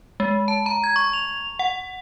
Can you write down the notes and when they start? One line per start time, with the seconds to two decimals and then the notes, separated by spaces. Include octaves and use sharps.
0.20 G#3
0.48 A5
0.66 A#5
0.84 G#6
0.96 C#6
1.13 F7
1.59 F#5